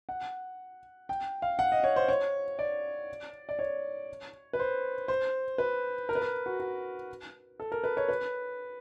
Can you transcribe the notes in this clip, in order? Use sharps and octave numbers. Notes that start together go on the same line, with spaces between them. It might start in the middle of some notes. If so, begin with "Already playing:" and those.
F#5
G5
F5
F#5
D#5
C#5
C5
C#5
D5
D5
C#5
B4
C5
C5
B4
A#4
B4
A#4
F#4
F#4
A4
A#4
B4
C#5
B4